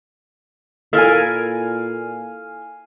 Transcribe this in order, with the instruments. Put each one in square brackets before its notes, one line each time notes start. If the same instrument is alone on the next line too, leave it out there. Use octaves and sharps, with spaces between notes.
[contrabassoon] A#2 [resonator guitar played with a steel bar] E4 A4 A#4 [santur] F5 G#5